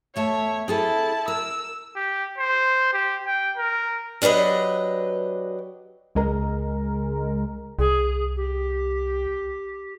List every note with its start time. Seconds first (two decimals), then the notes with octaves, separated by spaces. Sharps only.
0.16 E2 A3 C#5 E5 A5
0.68 C4 E4 G#4 A4 A5
1.28 A#4 E6
1.96 G4
2.38 C5
2.93 G4
3.26 G5
3.57 A#4
4.22 F#3 D4 G4 B4 D#5
6.15 C#2 G#3 A#4
7.79 C2 G#4
8.36 G4